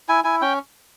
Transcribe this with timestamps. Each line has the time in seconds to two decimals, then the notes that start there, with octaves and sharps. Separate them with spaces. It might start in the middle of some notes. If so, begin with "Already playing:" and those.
0.09 E4 G#5
0.24 E4 G#5
0.42 C#4 G5